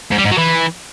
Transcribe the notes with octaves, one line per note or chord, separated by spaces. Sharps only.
G#2
G3
G#2
F#3
E3